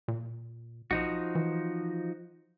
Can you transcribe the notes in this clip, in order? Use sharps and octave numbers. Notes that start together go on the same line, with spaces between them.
A#2
B1 F3 D#4 F#4
E3